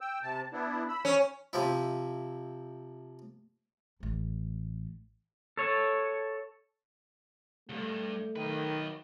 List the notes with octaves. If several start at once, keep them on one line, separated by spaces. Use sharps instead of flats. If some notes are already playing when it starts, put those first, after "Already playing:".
G5 E6
C3 A5
B3 D4 E4
B5 E6
C#4
C3 F3 E4
A1 A3
A4 C#5
C#2 G2 A3
D#3 F#3 B4